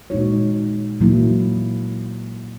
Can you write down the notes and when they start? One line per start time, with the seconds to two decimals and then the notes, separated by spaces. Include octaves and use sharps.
0.10 A#2 G#3 D#4 F#4 C#5
1.01 A#2 F#3 A#3 E4